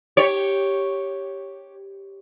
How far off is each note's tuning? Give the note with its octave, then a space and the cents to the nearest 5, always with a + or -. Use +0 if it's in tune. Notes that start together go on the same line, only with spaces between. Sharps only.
G4 +0 C#5 +0